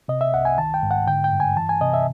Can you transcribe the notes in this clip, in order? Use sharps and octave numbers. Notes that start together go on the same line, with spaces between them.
C3 D#5
E5
C2 F#5
G#5
D#3 A5
G5
G#2
F#5
D3 G5
G5
G2
G#5
E3 A5
G#5
C3 D#5
E5